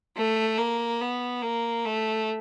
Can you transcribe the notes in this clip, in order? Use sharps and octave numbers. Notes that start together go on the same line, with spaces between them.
A3
A#3
B3
A#3
A3